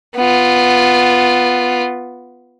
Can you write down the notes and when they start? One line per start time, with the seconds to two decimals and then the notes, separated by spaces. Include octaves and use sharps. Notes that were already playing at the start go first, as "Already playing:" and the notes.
0.16 B3 F4